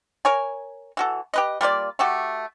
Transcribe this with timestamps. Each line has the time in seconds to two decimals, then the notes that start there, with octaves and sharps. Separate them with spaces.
0.25 A#4 C#5 G#5
0.97 E3 F#4 A4
1.34 G4 B4 D#5
1.61 G3 A#3 F4 D5
1.99 A3 F#4 G4